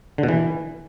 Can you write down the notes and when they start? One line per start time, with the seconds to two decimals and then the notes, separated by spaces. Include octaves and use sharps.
0.18 D3
0.23 B2
0.28 E3